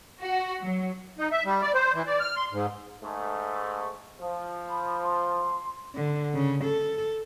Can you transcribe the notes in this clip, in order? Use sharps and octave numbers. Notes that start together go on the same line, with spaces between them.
F#4
F#3
D#4
E5
G3
D5
C5
E3
D5
F6
C6
G#2
G#2 A3
F3
B5
C6
D3
C#3
A4